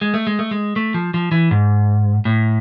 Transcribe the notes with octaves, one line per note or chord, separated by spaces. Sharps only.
G#3
A3
G#3
A3
G#3
A3
F3
F3
E3
G#2
A2